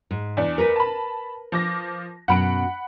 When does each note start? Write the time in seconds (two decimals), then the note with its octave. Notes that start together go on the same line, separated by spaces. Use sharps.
0.11 G#2
0.37 E2 D4
0.58 A#4 B4
0.76 A5 B5
1.52 F3 D6 A#6
2.28 F#2 B2 F#5 B5 D7